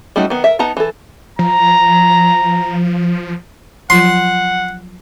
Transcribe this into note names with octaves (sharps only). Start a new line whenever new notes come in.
G3 A3 C#4 D#4 F#4
D#3 B3
A#4 E5
B3 D#4 A5 A#5
E3 A4
F3 A#5
F3 F#3 F4 F#5 C6